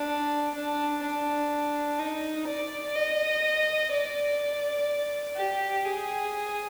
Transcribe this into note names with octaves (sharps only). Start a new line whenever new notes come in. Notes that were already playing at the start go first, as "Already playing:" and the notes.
Already playing: D4
D4
D4
D#4
D5
D#5
D5
G4
G#4